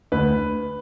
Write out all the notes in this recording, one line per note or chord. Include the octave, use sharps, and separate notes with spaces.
D2 B4